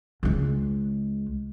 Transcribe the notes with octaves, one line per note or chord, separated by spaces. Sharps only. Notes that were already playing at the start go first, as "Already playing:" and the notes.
C#2 G#3